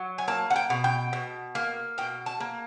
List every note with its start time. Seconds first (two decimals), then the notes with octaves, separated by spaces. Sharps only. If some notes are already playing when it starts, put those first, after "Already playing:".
Already playing: F#3
0.18 G#5
0.28 A#3 A5
0.50 F#5
0.56 G5
0.70 B2
0.84 G5
1.13 B2
1.55 A#3
1.98 B2 G5
2.26 A5
2.40 A#3